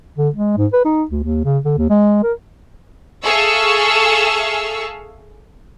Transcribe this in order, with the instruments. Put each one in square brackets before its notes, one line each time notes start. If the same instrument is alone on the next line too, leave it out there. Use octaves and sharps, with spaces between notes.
[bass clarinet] D3
G#3
G#2
B4
D#4
D2
D#2
C#3
D3
D#2
G#3
A#4
[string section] G#4 A4 E5 F5 C#6 E6